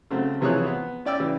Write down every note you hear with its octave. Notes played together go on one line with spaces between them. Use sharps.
C#3 F#3 A3 C4
C3 E3 F3 G#4 C#5 F#6
B3
C#4 D5 G5 E6
C#3 E3